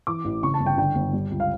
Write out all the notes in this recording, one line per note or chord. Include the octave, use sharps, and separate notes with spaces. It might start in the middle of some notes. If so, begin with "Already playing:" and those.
E3 D6
A1
C#3 C#6
A5
G1
G5
D3 G5
G1
G3
C#2
F5